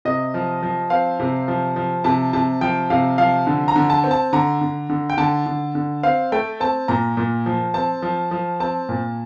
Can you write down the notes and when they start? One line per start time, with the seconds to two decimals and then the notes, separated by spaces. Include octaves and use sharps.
0.05 C3 D#5
0.34 F3
0.63 F3
0.90 C4 F5
1.20 C3
1.48 F3
1.76 F3
2.04 C3 A5
2.33 C3 A5
2.61 F3 G5
2.90 C3 F5
3.18 F3 F5
3.47 D3
3.68 A#5
3.76 D3
3.90 A5
4.04 C4
4.11 A5
4.33 D3 A#5
4.61 D3
4.90 D3
5.10 G5
5.18 D3 A5
5.46 D3
5.75 D3
6.03 C4 F5
6.32 A3 G5
6.60 C4 A5
6.88 A#2 A#5
7.17 A#2
7.46 F3
7.74 C4 A5
8.02 F3
8.31 F3
8.60 C4 A5
8.89 A#2